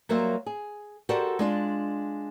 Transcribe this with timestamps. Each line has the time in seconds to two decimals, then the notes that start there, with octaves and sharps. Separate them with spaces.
0.09 F#3 G3 A#3 C5 E5
0.46 G#4
1.09 F#4 G4 A4 A#4 C5 D5
1.39 G#3 D4 F4